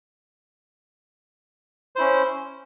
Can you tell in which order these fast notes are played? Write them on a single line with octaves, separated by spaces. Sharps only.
C5 E4 C#4